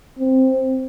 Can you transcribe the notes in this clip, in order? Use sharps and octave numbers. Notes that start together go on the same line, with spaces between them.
C4